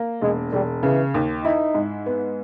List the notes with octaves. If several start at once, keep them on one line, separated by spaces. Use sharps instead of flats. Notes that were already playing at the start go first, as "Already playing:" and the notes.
Already playing: A#3
E1 G#3
E1 G3
C#3 E3
D#2
D#4 E4
G#2
B3